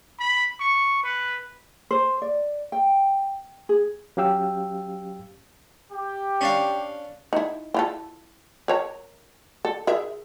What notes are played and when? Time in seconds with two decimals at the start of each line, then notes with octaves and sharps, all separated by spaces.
0.19 B5
0.60 C#6
1.03 B4
1.91 C5
2.22 D5
2.72 G5
3.69 G#4
4.17 F#3 C#4 G4 F5 G5 E6
5.92 G4
6.41 C#4 D4 F5
7.33 D#4 E4
7.74 E4 F4 A4
8.68 A#4 C#5 A#5
9.65 A4
9.87 G#4 A#4 E5